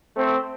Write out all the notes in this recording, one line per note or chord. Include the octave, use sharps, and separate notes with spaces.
A3 C4